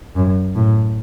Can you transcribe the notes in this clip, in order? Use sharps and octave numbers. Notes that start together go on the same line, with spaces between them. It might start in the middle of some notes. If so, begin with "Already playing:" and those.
F#2
A2